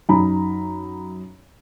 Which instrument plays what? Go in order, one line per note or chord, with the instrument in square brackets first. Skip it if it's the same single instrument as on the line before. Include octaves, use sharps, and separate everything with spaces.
[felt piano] F#2 D#4 A#5 B5